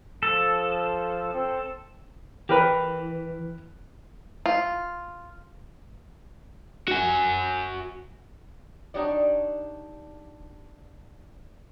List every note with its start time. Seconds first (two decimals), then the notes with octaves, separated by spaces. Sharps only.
0.23 F3 A4
1.33 C4
2.49 E3 G4 A#4 B4
4.46 F4
6.88 F#4 G#5
8.94 D4 D#4 F#4 G4 C#5 D5